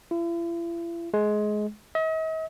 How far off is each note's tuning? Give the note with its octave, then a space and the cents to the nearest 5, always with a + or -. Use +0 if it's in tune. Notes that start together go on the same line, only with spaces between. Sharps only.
E4 +45
G#3 +20
D#5 +45